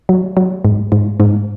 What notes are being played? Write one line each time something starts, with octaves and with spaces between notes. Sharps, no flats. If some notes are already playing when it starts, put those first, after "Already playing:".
F#3
F#3
G#2
G#2
G#2